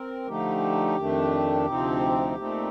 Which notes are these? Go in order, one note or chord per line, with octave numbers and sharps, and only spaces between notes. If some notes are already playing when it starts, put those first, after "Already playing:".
Already playing: C4 A#4
D3 F3 A3 D#4 G4
F2 D#3 A3 D4
D2 C3 F3 C4 D#4
A#2 A3 C4 D#4